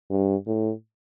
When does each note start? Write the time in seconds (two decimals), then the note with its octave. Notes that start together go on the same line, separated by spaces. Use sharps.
0.11 G2
0.47 A2